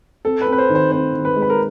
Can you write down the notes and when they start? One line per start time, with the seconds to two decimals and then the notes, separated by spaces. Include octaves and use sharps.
0.25 C4 A4
0.41 B4
0.46 C4
0.52 B4
0.58 C5
0.69 D#3
0.75 C5
0.91 C4 C5
1.14 D#3
1.25 B4
1.36 G#3
1.42 B4
1.50 A#4